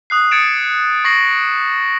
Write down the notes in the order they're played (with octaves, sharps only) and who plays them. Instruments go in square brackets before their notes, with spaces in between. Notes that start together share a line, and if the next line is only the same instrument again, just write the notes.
[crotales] D#6 F#6 C7
D#6 G#6 A6 C#7 D7 E7
C#6 G#6 A#6 C7 F#7